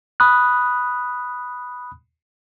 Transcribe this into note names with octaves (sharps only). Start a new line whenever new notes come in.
B5 D#6 F#6